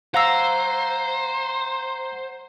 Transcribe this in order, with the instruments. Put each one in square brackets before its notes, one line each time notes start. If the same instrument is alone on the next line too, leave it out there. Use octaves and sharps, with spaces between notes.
[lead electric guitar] C5 [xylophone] F5 E6 [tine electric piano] F#5 A#5